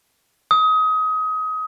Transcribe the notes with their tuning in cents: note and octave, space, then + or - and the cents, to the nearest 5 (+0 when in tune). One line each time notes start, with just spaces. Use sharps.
D#6 +25